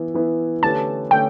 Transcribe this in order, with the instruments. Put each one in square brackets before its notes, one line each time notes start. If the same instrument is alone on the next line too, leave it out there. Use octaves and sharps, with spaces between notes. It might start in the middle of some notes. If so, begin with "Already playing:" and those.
Already playing: [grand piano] E3 B3 E4 B4
E3 B3 E4 B4
[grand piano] D3 A3 C#4 G4 B4 [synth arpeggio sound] A5
[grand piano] D3 A3 C#4 [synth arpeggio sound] G5